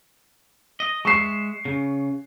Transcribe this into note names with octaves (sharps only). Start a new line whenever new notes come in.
D#5
G#3 E5 C#6 C7
C#3